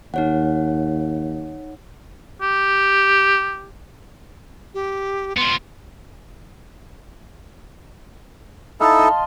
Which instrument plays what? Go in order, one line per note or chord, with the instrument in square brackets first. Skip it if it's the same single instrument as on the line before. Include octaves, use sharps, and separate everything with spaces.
[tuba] D#2 [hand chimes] D#4 C#5 F#5
[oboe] G4
[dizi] G4
[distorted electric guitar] B3 F4 [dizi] C6
[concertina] D#4 E4 A4 [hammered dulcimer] F5 A5
[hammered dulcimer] D#5 C6